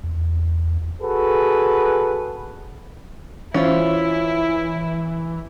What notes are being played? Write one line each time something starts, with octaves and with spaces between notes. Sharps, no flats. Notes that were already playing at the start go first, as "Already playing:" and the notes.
E2
F#4 G#4 A4 B4
E3 C#4 E4 F4 C5